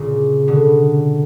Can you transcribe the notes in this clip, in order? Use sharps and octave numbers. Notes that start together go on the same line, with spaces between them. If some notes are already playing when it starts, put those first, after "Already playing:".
Already playing: A#2 C#3
B2 D3